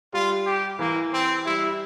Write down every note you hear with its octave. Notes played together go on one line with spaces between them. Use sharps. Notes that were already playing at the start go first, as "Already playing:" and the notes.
G3 F4
G4
E3 A#3
C4
G3 E4